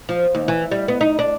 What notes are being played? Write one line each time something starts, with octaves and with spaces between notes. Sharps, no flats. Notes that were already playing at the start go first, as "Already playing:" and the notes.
F3
D#2
E3
G3
B3
D#4
D4